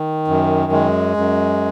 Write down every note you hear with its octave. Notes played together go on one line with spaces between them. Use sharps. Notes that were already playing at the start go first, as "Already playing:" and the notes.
Already playing: D#3
F#2
G#3
F#2